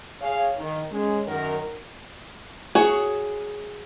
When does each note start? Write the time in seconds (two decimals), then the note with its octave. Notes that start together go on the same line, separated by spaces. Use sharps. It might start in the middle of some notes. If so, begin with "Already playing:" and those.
0.21 G#4 C#5 F5
0.57 D#3
0.91 G#3 C#4
1.27 F#2 D#3 A#4 F#5
2.75 F#4 G#4 C#5